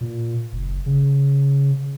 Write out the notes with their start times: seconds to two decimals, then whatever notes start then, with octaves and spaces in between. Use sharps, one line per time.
0.01 A#2
0.53 F#1
0.86 C#3